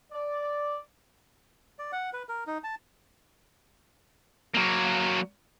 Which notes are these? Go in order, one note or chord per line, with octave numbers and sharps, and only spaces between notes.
D5
D5
F#5
B4
A#4
D#4
A5
F#3 A#3